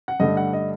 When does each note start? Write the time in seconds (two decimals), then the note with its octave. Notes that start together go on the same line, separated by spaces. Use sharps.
0.08 F#5
0.20 G2 D3 A3 D#5
0.37 F#5
0.53 D#5